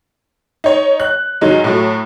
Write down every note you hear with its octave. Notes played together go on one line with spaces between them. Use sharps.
D#4 C#5
F#6
G#2 D#3 F#3 G#3
A2 F#3 A3